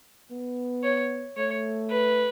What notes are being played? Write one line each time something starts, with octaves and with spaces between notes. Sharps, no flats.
B3
C#5
A3 C#5
B4